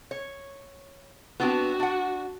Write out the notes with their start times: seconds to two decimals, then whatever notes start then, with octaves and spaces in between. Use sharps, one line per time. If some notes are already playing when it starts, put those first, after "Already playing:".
0.11 C#5
1.40 B3 C4 D4 F#4
1.80 D4 F#5